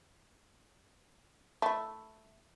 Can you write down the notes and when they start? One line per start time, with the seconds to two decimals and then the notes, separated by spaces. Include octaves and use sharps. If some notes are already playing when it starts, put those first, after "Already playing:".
1.62 A3 E4